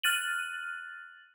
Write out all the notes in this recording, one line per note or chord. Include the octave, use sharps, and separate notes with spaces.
F6 F#6 A6 D#7 F#7